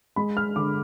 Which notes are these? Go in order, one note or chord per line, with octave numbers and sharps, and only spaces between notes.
G#3 B5
F6
D3 D6